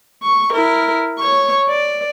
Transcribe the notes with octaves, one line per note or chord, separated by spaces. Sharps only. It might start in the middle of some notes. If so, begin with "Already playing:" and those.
C#6
E4 A#4
C#5 C#6
D5